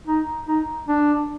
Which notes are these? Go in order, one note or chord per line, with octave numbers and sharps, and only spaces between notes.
D#4
D#4
D4